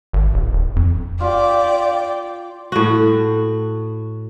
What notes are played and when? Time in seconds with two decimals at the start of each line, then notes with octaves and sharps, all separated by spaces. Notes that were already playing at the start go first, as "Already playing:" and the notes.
0.13 G#1
0.34 D1
0.53 D#1
0.76 F2
1.20 F4 G4 D5 G5
2.72 A2 F#4